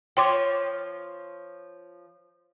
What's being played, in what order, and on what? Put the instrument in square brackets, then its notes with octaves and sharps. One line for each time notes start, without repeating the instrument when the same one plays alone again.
[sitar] F3 C#5 [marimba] G5 C6 D6